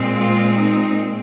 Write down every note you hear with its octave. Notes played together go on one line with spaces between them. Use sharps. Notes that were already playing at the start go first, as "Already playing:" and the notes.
Already playing: A#2 G#3 C4
F4
D#4